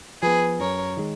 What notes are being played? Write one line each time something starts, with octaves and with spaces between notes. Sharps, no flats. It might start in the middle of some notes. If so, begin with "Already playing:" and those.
F3 B3 G#4 B4
F#2 A#4 C#5
D#3 G#3